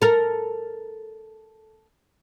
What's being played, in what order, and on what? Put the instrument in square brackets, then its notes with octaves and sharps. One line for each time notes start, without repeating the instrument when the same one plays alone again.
[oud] A4 A#4